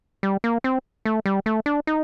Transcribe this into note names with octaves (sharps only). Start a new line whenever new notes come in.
G3
A#3
C4
A3
G3
A3
D4
D#4